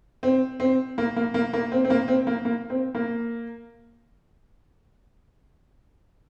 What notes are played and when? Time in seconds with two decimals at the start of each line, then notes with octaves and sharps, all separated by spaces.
0.23 C4
0.60 C4
0.98 A#3
1.16 A#3
1.34 A#3
1.53 A#3
1.72 C4
1.85 C4
1.90 A#3
2.08 C4
2.27 A#3
2.45 A#3
2.70 C4
2.95 A#3